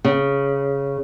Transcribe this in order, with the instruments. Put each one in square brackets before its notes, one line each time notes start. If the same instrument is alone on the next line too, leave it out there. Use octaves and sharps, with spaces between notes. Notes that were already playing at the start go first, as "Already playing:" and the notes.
[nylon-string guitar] C#3